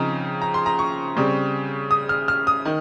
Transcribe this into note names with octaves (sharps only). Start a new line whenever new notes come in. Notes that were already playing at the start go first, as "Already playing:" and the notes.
Already playing: C#3 F3 C4 D#4 A#5
A#5
C6
A#5
C#6
C#3 G3 C4
D#6
F6
F6
D#6
D#3